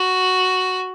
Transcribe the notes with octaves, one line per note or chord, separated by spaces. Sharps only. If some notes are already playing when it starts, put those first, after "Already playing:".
Already playing: F#4